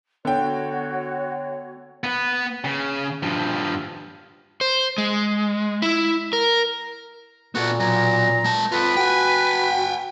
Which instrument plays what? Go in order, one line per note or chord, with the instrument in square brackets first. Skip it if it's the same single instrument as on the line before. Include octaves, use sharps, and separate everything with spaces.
[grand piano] D3 G5 [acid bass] B3 [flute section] F#4 C#5
[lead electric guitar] B3 B4
C#3
G2 F3
[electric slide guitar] C5
G#3
E4
A#4
[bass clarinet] A#2 [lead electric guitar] B3 A4 [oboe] F#4
[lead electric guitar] B2 F#3 [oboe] A#5
[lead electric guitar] G#3 A5
[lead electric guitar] F4 A4 [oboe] B4
[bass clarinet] F#4 [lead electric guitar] G5 G#5